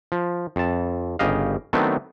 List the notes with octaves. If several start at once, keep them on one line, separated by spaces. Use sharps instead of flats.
F3
F2 A5
G1 C#3 G4 D#5 F5
D#3 F#3 A3 B3 C4 D4